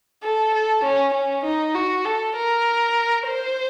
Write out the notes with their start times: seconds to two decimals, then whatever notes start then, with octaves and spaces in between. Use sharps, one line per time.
0.23 A4
0.54 A4
0.84 C#4
1.14 C#4
1.45 D#4
1.75 F#4
2.05 A4
2.36 A#4
3.27 C5